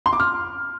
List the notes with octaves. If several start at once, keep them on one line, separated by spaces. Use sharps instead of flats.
C6
D6
F6